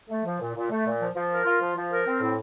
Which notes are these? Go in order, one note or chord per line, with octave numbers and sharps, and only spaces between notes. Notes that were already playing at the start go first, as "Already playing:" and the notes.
A3
F3
A#2
A#2
A3
A#2
F3
F3
A#4
F4
F3
F3
A#4
C4
A2